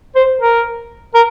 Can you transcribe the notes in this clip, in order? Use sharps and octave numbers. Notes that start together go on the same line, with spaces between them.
C5
A#4
A#4